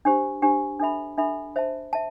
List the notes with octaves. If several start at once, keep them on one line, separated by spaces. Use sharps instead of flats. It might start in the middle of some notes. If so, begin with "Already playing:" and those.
D4 G4 C5
D4 G4 C5
D4 A4 E5 B5
D4 A4 E5 B5
C5 E5 A5
E5 A5